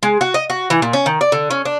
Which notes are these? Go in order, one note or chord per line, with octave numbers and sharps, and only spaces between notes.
G#3
F#4
D#5
F#4
E3
A#2
C#4
D#3
D5
D3
C#4
D4